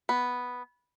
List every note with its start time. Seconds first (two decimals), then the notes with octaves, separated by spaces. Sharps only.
0.09 B3